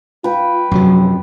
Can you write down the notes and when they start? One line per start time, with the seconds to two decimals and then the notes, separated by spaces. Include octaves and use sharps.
0.24 F4 B4 G5
0.71 F#2 C3 F3 F#3